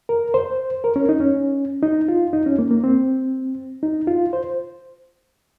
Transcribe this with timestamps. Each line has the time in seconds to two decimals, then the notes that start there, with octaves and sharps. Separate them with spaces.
0.09 A#4
0.34 C5
0.84 A#4
0.96 C#4
1.09 D#4
1.20 C#4
1.83 D#4
2.08 F4
2.33 D#4
2.46 C#4
2.59 A#3
2.71 A#3
2.84 C4
3.83 D#4
4.07 F4
4.33 C5